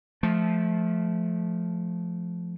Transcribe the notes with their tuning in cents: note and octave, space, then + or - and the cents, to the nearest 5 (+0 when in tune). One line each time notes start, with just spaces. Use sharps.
F3 +0 A3 -20